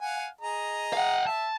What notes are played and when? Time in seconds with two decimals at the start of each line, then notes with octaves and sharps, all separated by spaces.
0.01 F5 F#5 G#5
0.41 G#4 D#5 A#5
0.93 F5 F#5
1.27 E5 A5